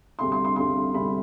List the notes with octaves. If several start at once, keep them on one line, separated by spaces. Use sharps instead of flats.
D2 C3 G3 C6
C6
C6
D2 C3 G3 C6
D2 C3 G3 B5